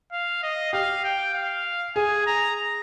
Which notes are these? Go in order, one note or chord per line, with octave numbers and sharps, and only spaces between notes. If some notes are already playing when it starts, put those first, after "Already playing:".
F5
D#5
G4 F5
G5
F5
G#4 G#5
A#5